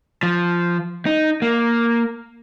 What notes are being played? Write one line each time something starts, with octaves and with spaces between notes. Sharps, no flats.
F3
D#4
A#3